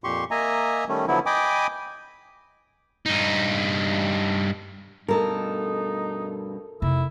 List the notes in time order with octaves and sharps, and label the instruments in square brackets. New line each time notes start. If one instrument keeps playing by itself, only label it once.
[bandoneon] F2 A#2 G4 C6 C#6
A#3 D#5 E5 G#5 A#5
D#3 G3 A3 C#4
D3 F3 F#3 B3 E4
D#5 G5 G#5 B5 D6 D#6
[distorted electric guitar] G2 D#4
[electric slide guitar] G2 B2 [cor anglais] D#4 [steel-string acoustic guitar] A4 A#4
[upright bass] F1 [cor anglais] E4